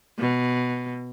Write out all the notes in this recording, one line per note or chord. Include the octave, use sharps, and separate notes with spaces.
B2